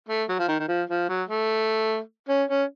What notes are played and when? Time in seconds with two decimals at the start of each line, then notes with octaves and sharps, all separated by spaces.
0.09 A3
0.29 F#3
0.39 F3
0.48 D#3
0.59 D#3
0.68 F3
0.89 F3
1.09 F#3
1.29 A3
2.29 C#4
2.49 C#4